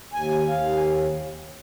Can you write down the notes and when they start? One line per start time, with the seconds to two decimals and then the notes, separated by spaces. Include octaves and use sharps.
0.13 D#2 G#5
0.48 D#2 F5
0.76 G#5